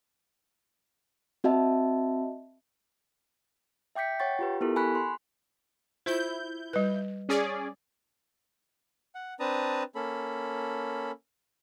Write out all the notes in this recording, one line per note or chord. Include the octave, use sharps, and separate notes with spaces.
C4 F#4 D#5 E5 A5
E5 G5 D6 G6 B6 C#7
C#5 F#5 G5 C#6 A6
F4 G4 B4
B3 E4 G4 A4 A#4
G#5 B5 C#6 F#6 B6
C6
E4 F4 C5 G6
G3 B4
C#4 G#4 D5
F#5
C4 D4 B4 A5 A#5 D#6
A#3 C#4 A4 B5